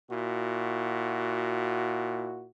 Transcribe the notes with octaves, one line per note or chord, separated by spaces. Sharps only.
A#2 E4 F#4